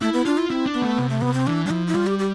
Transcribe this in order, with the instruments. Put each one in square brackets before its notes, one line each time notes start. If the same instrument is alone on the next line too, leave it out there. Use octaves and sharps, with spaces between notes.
[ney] A3 [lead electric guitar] E4
[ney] B3
[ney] D4 [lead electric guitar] F4
[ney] E4
[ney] C4 [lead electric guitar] E4
[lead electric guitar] D4
[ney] B3
[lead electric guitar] A3
C3
[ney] A3
[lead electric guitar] C3 [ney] B3
[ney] C4
[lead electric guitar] E3 [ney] D4
[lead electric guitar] G3 [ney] D4
[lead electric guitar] F3 [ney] E4
[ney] E4
[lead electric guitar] G3 [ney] F4
[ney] G4
G4